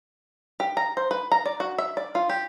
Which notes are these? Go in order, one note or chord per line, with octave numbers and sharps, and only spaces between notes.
G4
A#5
C5
B4
A#5
D5
F#4
E5
D5
F4
G4